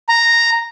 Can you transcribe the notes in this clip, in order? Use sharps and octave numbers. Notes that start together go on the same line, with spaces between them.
A#5